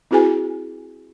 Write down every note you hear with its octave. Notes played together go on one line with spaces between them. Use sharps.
C4 E4 F#4 G#4 B4 G#5